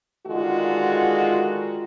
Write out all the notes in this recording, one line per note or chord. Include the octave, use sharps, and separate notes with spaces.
D3 D#3 G#3 F4 F#4